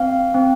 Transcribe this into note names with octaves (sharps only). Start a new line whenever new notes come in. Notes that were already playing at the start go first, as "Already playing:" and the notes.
Already playing: C4 F5
C4